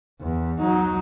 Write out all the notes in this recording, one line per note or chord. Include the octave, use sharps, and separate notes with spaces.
E2
F#3 D#4